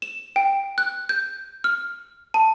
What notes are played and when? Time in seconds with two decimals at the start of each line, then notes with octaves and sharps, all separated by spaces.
0.02 E7
0.36 G5
0.78 F#6
1.09 G6
1.64 F6
2.34 A5